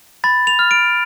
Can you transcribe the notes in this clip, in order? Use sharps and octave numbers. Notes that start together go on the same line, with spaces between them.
B5 A6
F7
F6
D7